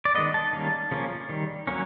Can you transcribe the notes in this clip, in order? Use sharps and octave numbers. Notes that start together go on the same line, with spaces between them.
D5
D#3 G#3 B3 D#5
A5
D#3 G3 A#3 C#4
C#3 F3 A#3 C#4
D#3 G3
F#3 A#3 C#4